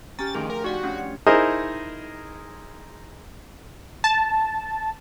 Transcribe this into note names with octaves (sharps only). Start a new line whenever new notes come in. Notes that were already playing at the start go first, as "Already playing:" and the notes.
C#4 G4 A#5 F6 A6
D2 D#3 F3 G#4 D6
A#4
D#4 F#4 D5 F#5 C#6
A3 C#4 D4 F4 C#5
C#7
D#4 E4 G#4 A#4 C5 D#5
A5